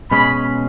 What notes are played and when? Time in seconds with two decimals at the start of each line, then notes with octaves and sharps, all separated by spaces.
0.11 B2 G#3 C#4 G#4 D#5 B5